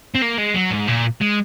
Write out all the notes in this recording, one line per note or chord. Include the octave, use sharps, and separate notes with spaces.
C4
A#3
G#3
F#3
G#2
A#2
G#3